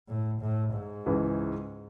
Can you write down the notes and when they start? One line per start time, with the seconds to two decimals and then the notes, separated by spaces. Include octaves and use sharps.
0.08 A2
0.41 A2
0.74 G#2
1.06 C#2 C#3 E3 G#3